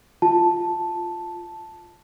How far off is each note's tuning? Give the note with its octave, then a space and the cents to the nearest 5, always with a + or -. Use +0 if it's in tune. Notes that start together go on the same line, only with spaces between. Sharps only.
F4 +0 A5 +0